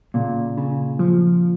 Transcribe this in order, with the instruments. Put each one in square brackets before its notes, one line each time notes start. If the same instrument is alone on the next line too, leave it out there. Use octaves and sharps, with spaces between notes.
[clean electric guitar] A#2 [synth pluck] C#3
[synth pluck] C#3
F3